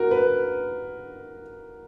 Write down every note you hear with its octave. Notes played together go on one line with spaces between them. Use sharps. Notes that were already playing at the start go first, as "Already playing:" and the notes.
Already playing: F#4 A#4
B4